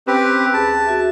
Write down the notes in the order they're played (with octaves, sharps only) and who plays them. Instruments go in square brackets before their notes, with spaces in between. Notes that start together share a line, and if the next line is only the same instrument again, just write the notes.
[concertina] C4 G4 B4 [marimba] C#4
[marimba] D#2 G#4 [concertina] A5
[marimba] F#4 E5